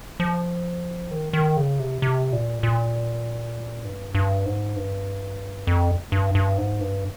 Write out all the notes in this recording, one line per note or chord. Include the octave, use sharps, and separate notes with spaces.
F3
D#3
D#3
C#3
C3
C3
A#2
A#2
G2
G2
G#2
G2
F2
G2
G2
G#2
G2